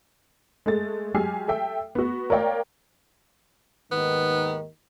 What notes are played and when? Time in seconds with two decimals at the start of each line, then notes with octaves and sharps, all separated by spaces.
0.66 G#3 A3 A6
1.14 F#3 G#3 G4 G#5 F6 C7
1.48 A4 E5 G5
1.95 B3 F#4
2.30 A#4 C#5 D5 F5 G5
3.92 D#2 G#2 D#3 B3